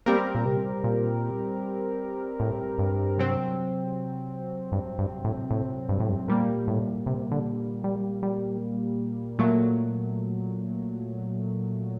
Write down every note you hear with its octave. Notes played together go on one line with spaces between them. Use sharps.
G3 A#3 C4 G4 A#4
A#2
C3
A#2
A2
G2
C3 F#3 C4
G2
G2
A2
A2
G2
A2
G2
A#2 G3 A#3
A2
C3
D3
G3
G3
A#2 F#3 A3 A#3